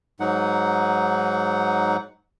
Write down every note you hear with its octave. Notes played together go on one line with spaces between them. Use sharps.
G#2 F#3 D#4 F#5